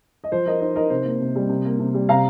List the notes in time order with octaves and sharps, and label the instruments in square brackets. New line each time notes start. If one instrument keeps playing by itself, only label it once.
[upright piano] D#5
F3 C5
F3 A#4 D#5
D#4 C5
D#4 A#4 D#5
C3 C5
A#3
C3
G3
C3
A#3
C3
G3
C3 F5 A#5